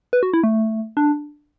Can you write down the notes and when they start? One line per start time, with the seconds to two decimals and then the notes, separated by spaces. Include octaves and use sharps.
0.13 B4
0.23 F#4
0.33 E4
0.44 A3
0.97 D4